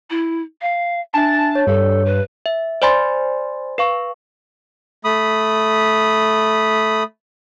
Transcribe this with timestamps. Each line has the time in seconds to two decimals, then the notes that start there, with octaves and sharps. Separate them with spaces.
0.10 E4
0.62 F5
1.14 D4 E5 G#5 A5
1.55 C#5
1.67 G2 A4
2.06 B4
2.46 E5
2.82 C5 D5 G#5 B5 C6 A6
3.78 B4 F5 C#6
5.04 A3 B5 D#6